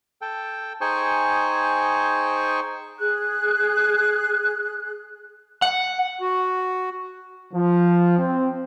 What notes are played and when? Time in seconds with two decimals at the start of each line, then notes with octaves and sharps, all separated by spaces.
0.21 A4 G5
0.81 D#4 G#4 C5 G5 G#5 C#6
2.99 G#4 F#6
5.62 F#5
6.20 F#4
7.53 F3
8.18 C4